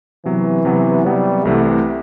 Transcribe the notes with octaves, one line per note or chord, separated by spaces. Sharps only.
C3 E3 F#3 B3
C3 F#3 B3
C3 F#3 G3 B3
C2 C3 E3 A3